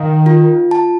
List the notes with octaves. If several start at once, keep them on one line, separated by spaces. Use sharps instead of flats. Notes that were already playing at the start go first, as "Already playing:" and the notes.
Already playing: D#3 F5
F4
A5